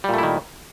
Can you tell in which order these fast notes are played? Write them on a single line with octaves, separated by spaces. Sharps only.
G3 A#2 A3 E4 D#3